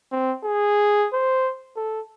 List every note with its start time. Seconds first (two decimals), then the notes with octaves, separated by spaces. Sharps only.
0.12 C4
0.44 G#4
1.13 C5
1.77 A4